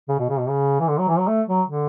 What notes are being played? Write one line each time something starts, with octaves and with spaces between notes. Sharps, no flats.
C#3
B2
C#3
B2
C#3
E3
D3
F#3
E3
F#3
A3
F#3
D3